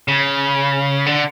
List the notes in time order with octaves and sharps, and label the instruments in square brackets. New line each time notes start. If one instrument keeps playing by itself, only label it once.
[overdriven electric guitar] C#3
D3